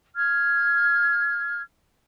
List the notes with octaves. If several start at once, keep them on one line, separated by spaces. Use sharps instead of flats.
F6 G#6